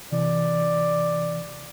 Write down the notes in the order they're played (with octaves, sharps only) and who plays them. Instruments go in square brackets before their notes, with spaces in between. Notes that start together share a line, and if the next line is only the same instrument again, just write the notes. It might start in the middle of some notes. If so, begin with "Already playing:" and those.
[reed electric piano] C3 E3 [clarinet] D5